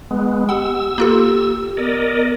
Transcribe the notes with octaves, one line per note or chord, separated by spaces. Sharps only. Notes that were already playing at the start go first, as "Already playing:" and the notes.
G#3 B3
G4 F#5 D#6 E6
A#3 F4 G4 A4
B3 A#4 D5 D#5